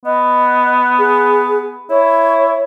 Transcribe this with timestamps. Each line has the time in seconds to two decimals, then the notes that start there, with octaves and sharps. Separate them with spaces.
0.05 B3 D#5
0.99 G#4
1.90 E4 C#5